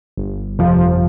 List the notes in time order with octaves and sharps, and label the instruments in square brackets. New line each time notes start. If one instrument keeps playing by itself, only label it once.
[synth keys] G1
F2 C3 F3